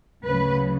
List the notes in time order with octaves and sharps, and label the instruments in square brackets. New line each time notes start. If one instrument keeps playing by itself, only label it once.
[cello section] D2 C#3 F#3 B4